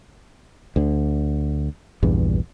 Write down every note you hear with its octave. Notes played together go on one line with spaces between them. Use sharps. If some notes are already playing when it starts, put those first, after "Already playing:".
D2 D3
A#1 E2 G2